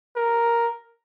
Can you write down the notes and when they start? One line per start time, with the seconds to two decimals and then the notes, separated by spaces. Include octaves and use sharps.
0.16 A#4